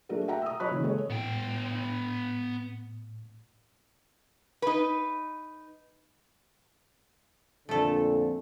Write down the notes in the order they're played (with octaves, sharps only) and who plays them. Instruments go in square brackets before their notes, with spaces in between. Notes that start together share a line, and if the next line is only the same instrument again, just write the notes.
[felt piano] F#3 A3 D4 F#4 G#4 A#4
E5 F#5 G5 A#5
D#6 E6
F#3 C#5 D#5 B5 F#6
C#3 E3
G#3 A4 C#5
[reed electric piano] A2 [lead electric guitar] B3 G5
[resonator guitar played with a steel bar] D#4 B4
[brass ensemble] F2 A#2 D3 [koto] A3 A4